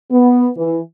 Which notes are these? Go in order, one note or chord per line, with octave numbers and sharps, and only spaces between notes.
B3
E3